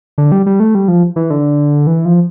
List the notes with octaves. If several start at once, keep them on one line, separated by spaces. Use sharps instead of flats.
D3
G3
G3
A3
G3
F3
E3
D3
E3
F3